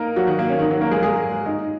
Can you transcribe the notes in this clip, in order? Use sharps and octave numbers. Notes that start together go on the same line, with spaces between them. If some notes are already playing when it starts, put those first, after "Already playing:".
Already playing: A#3 D#4 A#4
F#3 F#4
D#3 D#4
A#3
C#4
D#3 D#4
F#3 F#4
A#3 A#4
G#3 G#4
G#3 G#4
D#4 D#5